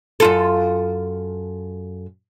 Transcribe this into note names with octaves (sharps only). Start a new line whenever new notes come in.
F#2 F4 A4